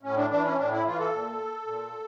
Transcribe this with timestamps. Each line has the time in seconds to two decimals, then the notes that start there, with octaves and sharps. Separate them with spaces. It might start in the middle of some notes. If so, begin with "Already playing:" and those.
0.03 A2 C#4
0.17 D4
0.30 E3 D4
0.45 C#4
0.57 A2 D4
0.71 E4
0.85 E3 F4
0.99 A4
1.13 A#2
1.67 A#2